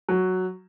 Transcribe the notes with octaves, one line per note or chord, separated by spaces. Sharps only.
F#3